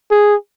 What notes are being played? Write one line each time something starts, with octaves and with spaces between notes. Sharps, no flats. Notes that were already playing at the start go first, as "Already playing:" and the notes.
G#4